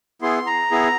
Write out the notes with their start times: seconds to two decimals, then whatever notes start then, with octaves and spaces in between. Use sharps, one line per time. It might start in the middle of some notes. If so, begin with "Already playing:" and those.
0.22 B3 E4 G#4 C6
0.47 A#5
0.71 B3 E4 G#4